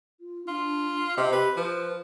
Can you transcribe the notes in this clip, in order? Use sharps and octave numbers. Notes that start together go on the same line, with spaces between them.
F4
D4 F4
C3 D#5
G4 B4
F3 B4